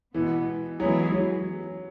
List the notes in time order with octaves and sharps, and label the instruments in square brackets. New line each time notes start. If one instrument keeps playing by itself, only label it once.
[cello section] B2 G#3 B3 [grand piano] E3
[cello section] E3 G#3 B3 E4 G#4 [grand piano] F#3
[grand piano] F#3